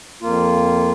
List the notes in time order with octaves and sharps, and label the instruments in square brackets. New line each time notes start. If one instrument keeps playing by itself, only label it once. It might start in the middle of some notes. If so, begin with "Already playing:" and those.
[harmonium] F2 A#3 F4